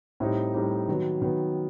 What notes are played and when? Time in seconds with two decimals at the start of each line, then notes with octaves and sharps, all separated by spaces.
0.20 A2 G3 C4 D#4 G4
0.54 A2 G3 C4 D#4 G4
0.88 D#3 F#3 B3
1.22 D#3 F#3 B3